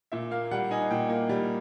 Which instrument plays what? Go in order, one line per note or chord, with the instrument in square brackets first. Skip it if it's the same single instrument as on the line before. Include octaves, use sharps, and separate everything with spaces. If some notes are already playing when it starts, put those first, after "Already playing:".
[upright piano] A#2 E5
A#3 F5
G3 F#5
D#4 G#5
A#2 G5
A#3
G3